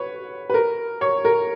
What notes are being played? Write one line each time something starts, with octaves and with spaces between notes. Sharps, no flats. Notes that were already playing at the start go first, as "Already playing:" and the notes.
Already playing: B4 C#5
B4
A#4
C#5
A#4